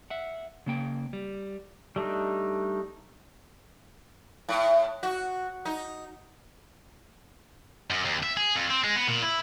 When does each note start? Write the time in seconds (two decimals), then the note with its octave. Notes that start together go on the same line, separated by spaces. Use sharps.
0.10 E5 F#5
0.66 C#3 A#3 G5
1.13 G3
1.96 G3 A3 D4 D#4
4.49 A2
5.03 F#4
5.65 D#4
7.90 F#2
8.05 D#2
8.23 E5
8.37 G#4
8.56 F2
8.70 C4
8.84 G#3
8.96 B3
9.08 A#2
9.22 E4